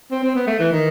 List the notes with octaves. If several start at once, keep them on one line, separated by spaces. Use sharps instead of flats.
C4
C4
B3
A3
E3
D#3